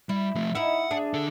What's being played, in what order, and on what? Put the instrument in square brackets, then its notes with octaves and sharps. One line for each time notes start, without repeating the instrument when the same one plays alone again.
[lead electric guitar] G3 [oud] E4
[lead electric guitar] F3 A3
[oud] D#4 E4 [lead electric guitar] F#5
[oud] D4 G#4
[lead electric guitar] D3 A4